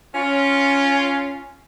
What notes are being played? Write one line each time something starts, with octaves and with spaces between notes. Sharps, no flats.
C#4 F4